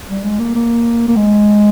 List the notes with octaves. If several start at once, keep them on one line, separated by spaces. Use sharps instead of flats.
G3
G#3
A#3
A#3
A#3
G#3